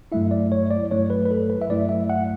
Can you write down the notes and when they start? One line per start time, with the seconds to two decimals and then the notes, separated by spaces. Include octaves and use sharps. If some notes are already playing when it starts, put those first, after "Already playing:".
0.12 G2 F#3 A3 E4 E5
0.31 D5
0.52 C#5
0.71 D5
0.91 G2 F#3 A3 E4 C#5
1.10 B4
1.25 B4
1.31 A4
1.50 B4
1.62 E5
1.69 G2 F#3 A3 E4 D5
1.89 E5
2.10 F#5